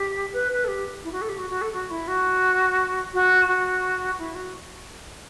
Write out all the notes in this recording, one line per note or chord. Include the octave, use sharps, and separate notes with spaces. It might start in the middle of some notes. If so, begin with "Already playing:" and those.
Already playing: G4
B4
B4
A4
G4
E4
F#4
A4
G4
F#4
F#4
A4
F#4
E4
F#4
F#4
F#4
E4
F#4